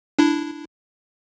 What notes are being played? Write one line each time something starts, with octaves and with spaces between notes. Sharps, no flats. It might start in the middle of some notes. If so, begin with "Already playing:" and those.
D4 E4